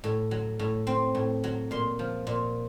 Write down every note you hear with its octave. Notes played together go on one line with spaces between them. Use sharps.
A2
F#3
A2
C4
A2
F#3
A#2 C6
F3
A#2